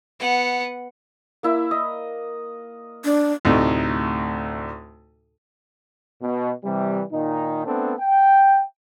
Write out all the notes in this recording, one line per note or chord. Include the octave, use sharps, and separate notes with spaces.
B3 F#5
A#3 E4 E5
D#5
D4
D2 A2 C3 D#4
B2
C3 E3 G3
A#2 D#3 D#4
A3 B3 C4 D4 A4
G5